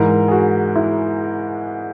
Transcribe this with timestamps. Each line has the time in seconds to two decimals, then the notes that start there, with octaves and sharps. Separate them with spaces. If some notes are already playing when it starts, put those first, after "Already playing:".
Already playing: G#2 E3 A#4
0.28 G#4
0.32 F#4
0.76 E4